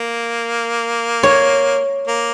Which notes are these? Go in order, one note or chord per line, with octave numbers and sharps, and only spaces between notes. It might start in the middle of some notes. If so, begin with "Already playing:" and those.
Already playing: A#3
C#5
A#3